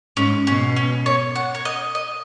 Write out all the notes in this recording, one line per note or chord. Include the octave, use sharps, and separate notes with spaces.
G#2 C#4
B2 C#4
C#4
C#5
F#5
C#5
D#5
D#5